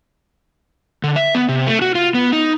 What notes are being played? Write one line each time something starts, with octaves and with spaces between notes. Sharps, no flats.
D3
E5
B3
C3
A3
F#4
F4
B3
D#4